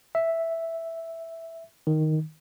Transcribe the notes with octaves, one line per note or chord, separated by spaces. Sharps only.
E5
D#3